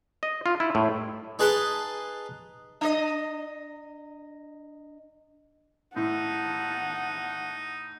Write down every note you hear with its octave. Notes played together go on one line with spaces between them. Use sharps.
D#5
F4
E4
A2
D#4 G#4 B4 A5 C6
D4 D#5
A2 D#4 F#5 A5